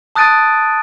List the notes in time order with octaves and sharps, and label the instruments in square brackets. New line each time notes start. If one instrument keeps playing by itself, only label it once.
[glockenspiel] A5 D#6 F#6 A6 D7 D#7